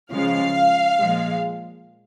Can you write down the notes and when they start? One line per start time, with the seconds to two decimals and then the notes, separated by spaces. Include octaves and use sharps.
0.11 C#3 F3 G#3 F5
1.00 A#2 F3 G#3